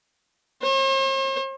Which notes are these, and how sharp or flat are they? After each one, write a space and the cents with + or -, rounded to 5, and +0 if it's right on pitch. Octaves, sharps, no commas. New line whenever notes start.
C5 +45